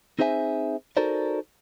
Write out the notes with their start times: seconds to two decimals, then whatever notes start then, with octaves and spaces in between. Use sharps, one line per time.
0.19 C4 D#4 G#4 C5 E5 G#5
0.97 D#4 F#4 A4 A#4 C5 D5